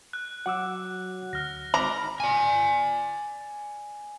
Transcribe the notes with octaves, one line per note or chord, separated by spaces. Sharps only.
F#6
F#3 F#5 D6 E6
D2 F6 A#6
G#1 A#5 B5 D6
D5 G#5